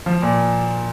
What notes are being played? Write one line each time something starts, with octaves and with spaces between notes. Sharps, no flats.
F3
A#2